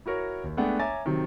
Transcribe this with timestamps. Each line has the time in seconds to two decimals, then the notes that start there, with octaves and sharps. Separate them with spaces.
0.06 E4 F#4 A#4 C#5
0.44 D#2
0.57 G#3 A3 B3 D4 F#5 G5
0.79 C#5 E5 G#5 A#5 D6 A6
1.05 C3 D#3 F#3 C4